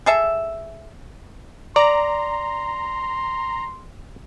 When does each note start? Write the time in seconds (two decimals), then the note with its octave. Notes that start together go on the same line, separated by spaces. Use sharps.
0.06 G#4 A4 E5
1.76 D5 A#5 C6